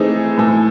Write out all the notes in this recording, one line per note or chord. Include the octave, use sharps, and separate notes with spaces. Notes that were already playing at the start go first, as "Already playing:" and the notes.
Already playing: E3 A3 C4 D#4 G#4
A2 E3 A3